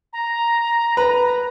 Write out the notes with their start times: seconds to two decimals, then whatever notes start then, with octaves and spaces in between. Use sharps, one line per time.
0.13 A#5
0.97 B4